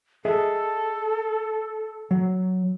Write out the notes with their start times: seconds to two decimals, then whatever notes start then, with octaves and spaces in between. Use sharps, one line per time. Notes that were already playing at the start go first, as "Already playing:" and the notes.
0.25 G#4 A4 D#5 E5
2.11 F#3